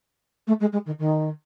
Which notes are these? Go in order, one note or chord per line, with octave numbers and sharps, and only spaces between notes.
A3
G#3
G#3
D#3
D#3